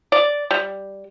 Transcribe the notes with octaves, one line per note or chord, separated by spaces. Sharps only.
D5
G3